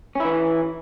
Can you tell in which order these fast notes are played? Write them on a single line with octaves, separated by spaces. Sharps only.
C#4 E4 E3